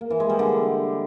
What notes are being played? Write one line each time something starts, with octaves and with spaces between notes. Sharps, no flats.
A#3
E3
G#3
G3
D3